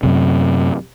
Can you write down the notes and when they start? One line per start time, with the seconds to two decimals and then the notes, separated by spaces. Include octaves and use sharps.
0.03 F#2 C3